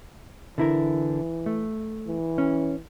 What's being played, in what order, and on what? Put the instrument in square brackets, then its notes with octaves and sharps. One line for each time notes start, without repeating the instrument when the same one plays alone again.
[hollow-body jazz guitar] D3 E4 A#4 [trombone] E3
[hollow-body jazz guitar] A3
[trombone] E3
[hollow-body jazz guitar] C#4